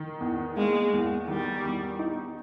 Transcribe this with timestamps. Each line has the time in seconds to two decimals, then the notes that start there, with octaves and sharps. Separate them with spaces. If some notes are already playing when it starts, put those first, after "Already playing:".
Already playing: D#3
0.20 E2
0.57 G#3 A#3
0.93 E2
1.28 D#3 G3
1.64 E2
1.99 D#4